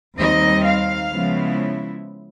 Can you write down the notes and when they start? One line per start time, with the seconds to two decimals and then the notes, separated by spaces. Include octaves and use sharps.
0.18 D#2 D#3 G3 C4 D#4 D#5
0.65 F5
1.12 C#3 F3 G#3 B3 E4